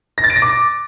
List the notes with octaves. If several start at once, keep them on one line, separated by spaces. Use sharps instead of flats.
A#6
A6
D7
A#6
D6